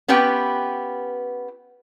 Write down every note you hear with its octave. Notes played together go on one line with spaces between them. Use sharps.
B3 C#4 F4 G4 B4 G5